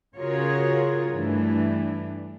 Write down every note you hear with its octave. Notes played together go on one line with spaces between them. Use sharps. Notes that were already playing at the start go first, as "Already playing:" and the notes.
C#3 F4 F#4 G#4 A#4 C#5
G2 E3 A3 D4